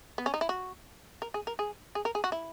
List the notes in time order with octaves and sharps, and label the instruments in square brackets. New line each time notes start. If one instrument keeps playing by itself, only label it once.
[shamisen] B3
C#4
D#4
E4
F#4
A#4
G#4
A#4
G#4
G#4
A#4
G#4
F#4
E4